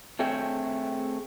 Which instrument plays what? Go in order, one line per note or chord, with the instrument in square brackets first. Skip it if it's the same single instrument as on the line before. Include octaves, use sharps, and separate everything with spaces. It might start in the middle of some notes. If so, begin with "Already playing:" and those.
[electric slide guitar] A3 C4 G#4 C#5 E5 G5